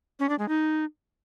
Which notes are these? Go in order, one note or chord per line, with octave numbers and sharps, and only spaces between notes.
C#4
D4
G#3
D#4